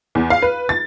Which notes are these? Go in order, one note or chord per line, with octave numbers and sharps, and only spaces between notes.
E2
F5
B4
A6